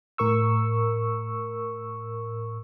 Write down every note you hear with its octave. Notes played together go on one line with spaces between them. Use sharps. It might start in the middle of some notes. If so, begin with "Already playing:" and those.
A2 A#4 C#6 E6